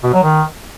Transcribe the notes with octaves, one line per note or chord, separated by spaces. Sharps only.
B2
F#3
D#3